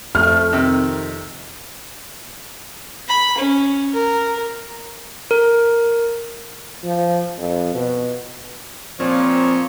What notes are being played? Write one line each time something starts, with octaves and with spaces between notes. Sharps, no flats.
F2 A3 F6
C3 D#3
B5
C#4
A#4
A#4
F3
F2
B2
A#2 F3 C4 C#5